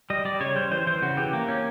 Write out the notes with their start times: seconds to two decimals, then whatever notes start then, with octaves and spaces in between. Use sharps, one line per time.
0.10 G3 D#5
0.25 G3 D5
0.40 C#3 C#5
0.56 G3 C5
0.71 E3 C5
0.87 E3 C5
1.02 C#3 F#4
1.17 E3 G4
1.33 A#3
1.48 C#4